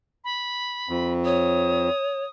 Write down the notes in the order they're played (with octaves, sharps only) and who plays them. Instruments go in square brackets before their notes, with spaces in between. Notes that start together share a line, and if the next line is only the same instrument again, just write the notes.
[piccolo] B5
[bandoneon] F2
[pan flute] C#5 [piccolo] D#6